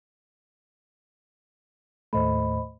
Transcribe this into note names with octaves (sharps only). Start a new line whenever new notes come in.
D#2 A2 A3 C5 D#5 B5